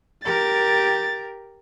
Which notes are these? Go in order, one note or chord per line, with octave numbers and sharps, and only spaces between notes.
G4 A#4 A6